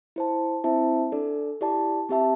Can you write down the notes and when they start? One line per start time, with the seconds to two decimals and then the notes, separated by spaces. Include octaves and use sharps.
0.16 E4 C5 A5
0.64 C4 E4 C5 E5 A5
1.12 D4 A4 D5
1.61 E4 G4 D5 A5
2.09 C4 G4 E5 A5